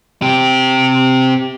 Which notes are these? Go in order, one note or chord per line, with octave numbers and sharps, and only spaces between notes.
C3 G4